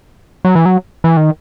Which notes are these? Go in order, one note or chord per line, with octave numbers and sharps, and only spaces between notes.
F#3
E3
F#3
E3
D#3